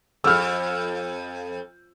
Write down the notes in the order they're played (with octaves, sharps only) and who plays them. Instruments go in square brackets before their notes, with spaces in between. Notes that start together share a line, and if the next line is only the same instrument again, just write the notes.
[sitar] F2 [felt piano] E6 F6